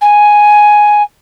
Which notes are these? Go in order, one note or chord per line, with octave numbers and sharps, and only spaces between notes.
G#5